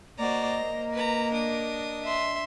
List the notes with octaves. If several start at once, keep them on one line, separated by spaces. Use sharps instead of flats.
A#3 F#4 C5 D5 D#5 A#5
A#3 A#4
B4 A#5
D4 D#6
E5 C6